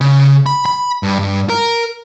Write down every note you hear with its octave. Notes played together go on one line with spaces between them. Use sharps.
C#3
B5
B5
G2
G2
A#4